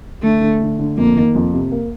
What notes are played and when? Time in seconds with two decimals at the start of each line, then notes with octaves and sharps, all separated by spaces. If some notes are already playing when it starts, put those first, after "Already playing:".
0.23 D3 A3
0.41 D3
0.60 D3
0.79 D3
0.97 F2 A#3
1.16 D#3
1.35 F2
1.53 C3
1.72 A#3